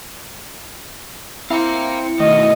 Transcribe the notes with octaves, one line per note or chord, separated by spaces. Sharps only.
C4 E4 F5 A#5 C#7
B2 D#3 A3 D#5